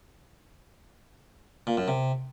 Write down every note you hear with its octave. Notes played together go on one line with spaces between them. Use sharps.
A#2
F#2
C3